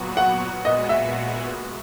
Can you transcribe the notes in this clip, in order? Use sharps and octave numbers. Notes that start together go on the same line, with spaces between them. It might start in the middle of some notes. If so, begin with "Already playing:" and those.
Already playing: A#2 F#3 B3 F#4
F#5
A#2 G#3 B3 F#4 D#5
E5